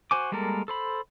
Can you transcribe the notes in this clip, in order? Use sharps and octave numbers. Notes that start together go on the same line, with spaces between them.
F#4 C5 G#5 D6
G3 G#3 A#3 A4 A#4
A4 C5 B5